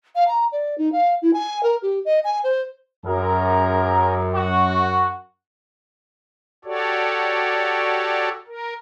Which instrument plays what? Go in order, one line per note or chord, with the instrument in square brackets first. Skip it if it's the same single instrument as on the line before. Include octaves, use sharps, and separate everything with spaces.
[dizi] F5
A#5
D5
D#4
F5
E4
G#5
A#4
G4
D#5
G#5
C5
[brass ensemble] F#2 [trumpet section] G#4 A#4
[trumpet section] F#4
[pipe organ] F#4 G4 A4 C#5 D5
A#4